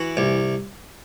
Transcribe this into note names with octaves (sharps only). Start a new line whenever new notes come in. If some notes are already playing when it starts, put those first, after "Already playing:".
Already playing: E3 F#4
C2